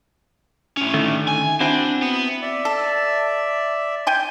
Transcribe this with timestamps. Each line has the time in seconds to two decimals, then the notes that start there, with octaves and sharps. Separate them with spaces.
0.77 A2 C#4
0.94 D3 D#3 A3
1.28 G#5
1.60 C4 D4 E4 F#4
2.02 B3
2.42 D5 E5
2.65 A4
4.07 G5 G#5 C6